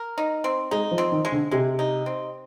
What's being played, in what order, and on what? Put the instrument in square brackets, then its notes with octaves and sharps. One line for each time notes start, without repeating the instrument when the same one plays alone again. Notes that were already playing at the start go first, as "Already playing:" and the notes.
Already playing: [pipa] A#4
D#4
C4
[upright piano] G#3 [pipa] D#4
[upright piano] F3
[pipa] C4
[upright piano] D#3
[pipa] G#3
[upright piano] D3
[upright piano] C3 [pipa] G#3
[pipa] D#4
C4